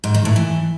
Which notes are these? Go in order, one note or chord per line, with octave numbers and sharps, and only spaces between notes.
G#2
D#3
A2
E3